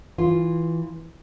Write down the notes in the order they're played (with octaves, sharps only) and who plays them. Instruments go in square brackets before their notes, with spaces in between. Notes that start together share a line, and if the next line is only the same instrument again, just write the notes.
[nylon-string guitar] E3 F4